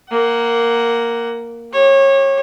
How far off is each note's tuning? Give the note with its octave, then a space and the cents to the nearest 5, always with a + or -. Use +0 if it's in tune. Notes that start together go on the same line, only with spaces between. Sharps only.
A#3 +0 F#5 +20
G4 +0 C#5 -25